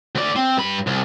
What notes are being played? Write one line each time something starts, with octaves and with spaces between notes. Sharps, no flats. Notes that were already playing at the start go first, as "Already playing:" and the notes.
D2 D5
C4
G2 B5
C2